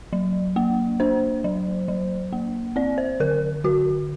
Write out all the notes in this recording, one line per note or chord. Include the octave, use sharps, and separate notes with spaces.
F#3
A#3
D4 C5
F#3
F#3
A#3
C4 D5
C5
D3 A#4
D3 F#4